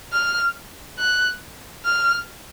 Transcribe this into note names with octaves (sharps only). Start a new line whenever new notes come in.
F6
F#6
F6